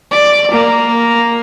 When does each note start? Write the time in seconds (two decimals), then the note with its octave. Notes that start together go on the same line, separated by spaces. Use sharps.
0.11 D5
0.51 A#3